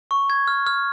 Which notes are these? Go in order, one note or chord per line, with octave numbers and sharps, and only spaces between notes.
C#6
G#6
F6
F6